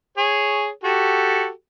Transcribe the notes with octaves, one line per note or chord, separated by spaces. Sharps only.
G#4 C#5
F#4 G4 A4